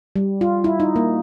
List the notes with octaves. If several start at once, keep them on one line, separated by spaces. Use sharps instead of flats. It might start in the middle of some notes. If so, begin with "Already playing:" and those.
G3
F4
E4
D#4
A#3